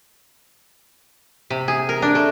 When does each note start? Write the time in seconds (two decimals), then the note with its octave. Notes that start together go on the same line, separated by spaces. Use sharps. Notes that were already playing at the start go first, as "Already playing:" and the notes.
1.50 C3
1.68 G#4
1.89 A#4
2.02 D4
2.15 A3